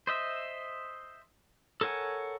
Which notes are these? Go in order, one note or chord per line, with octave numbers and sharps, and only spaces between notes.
C5 D#5 E5
A4 A#4 C#5 F#5 G#5